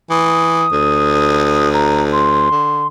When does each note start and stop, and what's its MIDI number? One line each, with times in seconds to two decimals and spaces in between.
0.10 0.66 52
0.10 1.72 87
0.72 2.47 38
1.73 2.04 82
2.12 2.87 84
2.51 2.87 50